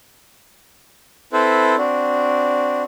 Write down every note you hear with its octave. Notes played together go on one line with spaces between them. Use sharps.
C4 E4 A4 B4 C5
C4 D4 F#4